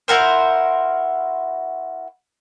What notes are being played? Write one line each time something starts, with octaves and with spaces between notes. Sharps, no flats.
E4 F#4 A#4 C5